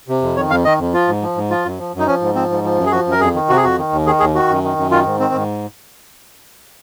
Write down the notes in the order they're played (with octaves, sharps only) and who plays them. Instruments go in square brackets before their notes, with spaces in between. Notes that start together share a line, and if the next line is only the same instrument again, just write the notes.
[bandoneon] C3
F2
D#3 C#5
F2 F5
D#3 D#5
F2
F3 F4
G#2
F3
G#2
F3 F4
F#2
F3
F#2
D#4
F3 C#4
G#2
F3 C4
G#2
F3
F#2
G#4
F3 F#4
F#2
A#4
F2 G#4
D#3
C3 F#4
G#4
F2 F#4
D#3
D#2
D#3 G#4
D#2 G#4
D#3 F#4
F#2
D#3
F#2
D#3 F4
G#2
D#3 C4
G#2